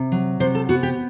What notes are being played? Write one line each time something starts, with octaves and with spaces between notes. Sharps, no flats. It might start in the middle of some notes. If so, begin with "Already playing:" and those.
Already playing: C3
F#3
C3 C5
A4
B3 F#4
G4